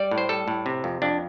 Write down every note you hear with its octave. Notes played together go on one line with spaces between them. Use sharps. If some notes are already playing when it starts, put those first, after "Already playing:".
Already playing: G3 D5
A2
C5
G3 A4
A2
C3
F2
F2 D4